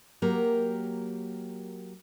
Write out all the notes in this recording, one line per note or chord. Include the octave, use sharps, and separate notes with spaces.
F#3 A#3 G4 A#4